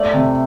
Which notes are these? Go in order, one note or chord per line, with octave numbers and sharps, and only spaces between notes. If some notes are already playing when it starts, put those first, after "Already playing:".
Already playing: A3 D5
C3